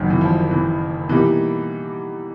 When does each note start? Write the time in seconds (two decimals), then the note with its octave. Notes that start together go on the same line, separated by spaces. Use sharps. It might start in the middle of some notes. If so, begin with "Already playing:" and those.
Already playing: F#1 F#2 D#3 F#3
0.10 E3
0.21 F3
0.51 E3
1.09 B2 E3 G3 A#3 D#4 G4